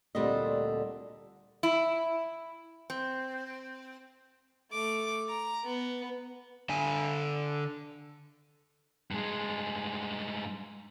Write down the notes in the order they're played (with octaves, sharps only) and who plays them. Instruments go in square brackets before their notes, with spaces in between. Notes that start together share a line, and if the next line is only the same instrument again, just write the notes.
[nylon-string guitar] D2 A#2 D3 G3 C4 D#5
[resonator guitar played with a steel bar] E4
C4
[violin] A3 D6
A#5
B3
[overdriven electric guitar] D3 G#5
[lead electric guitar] G2 G#3